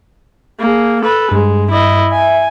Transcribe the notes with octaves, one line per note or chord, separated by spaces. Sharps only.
A#3 G#4
A4 B4
G2 G#3
E4 D#5
E5 G#5